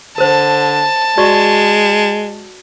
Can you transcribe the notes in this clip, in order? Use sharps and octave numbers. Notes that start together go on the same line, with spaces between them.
D3 A#4 C5 A5
G#3 F#4 D5 C#6